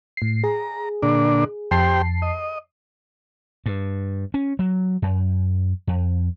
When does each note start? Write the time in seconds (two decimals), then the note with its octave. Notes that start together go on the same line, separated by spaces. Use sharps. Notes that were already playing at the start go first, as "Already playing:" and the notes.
0.17 A2 C7
0.44 G#4 A#5
1.02 A#2 D3 D4
1.71 F2 G4 C5 G5 A5 C7
2.22 D#5
3.66 G2
4.34 C#4
4.59 F#3
5.02 F#2
5.87 F2